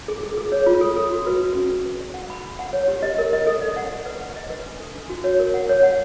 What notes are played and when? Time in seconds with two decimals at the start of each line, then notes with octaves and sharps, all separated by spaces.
0.08 G#4
0.23 G#4
0.37 G#4
0.52 C#5
0.66 F4
0.81 A4
0.96 A4
1.11 F#4
1.27 B4
1.41 F#4
1.55 C#4
1.71 G#4
1.85 B4
2.00 D5
2.14 F#5
2.30 B5
2.45 B5
2.59 F#5
2.73 C#5
2.88 G4
3.03 D#5
3.18 A#4
3.33 D#5
3.47 A4
3.62 D5
3.76 F#5
3.91 D5
4.06 B4
4.21 F#5
4.36 D#5
4.50 B4
4.66 D4
4.80 A4
4.96 D4
5.09 F#4
5.24 C#5
5.39 A#4
5.54 F#5
5.69 C#5
5.83 F#5